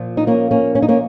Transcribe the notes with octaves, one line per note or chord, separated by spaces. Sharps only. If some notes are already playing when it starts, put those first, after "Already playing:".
Already playing: A#2 F3
D#4
A#3 C#4
A#3 C#4
C#4
D#4
A#3 C#4